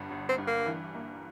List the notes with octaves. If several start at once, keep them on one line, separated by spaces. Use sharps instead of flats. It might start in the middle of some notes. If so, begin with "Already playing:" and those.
Already playing: G1 G2
G1
C4
G2
A#3
E3
A#3